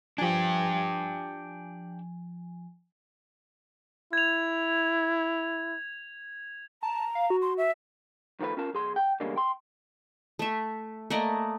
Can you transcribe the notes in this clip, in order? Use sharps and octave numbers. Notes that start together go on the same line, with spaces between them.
F3 D4 G4 G#5
E4 G#6 F7
A5 A#5
F5
F#4
C6
E5
D#3 F3 A3 B4
C#4 F4 A#4 A5
B1 G#4 C6
G5
E2 D3 G3 G#3 A#3 C#4
G5 C6
A3 E5
A3 A#3 D5 D#5